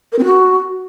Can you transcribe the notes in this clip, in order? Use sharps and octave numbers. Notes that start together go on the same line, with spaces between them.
A#4
C4
F#4